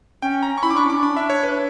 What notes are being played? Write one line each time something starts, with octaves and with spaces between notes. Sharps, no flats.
C#4 G5
A#5
C#6
E4 B5
D6
D4 C#6
C#4 D6
D4
B5
E5
C#5
B4